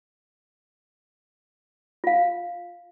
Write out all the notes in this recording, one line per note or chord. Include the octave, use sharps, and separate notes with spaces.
F4 F5